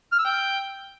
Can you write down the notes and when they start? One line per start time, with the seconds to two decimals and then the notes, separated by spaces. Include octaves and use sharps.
0.12 F6
0.19 E6
0.25 G5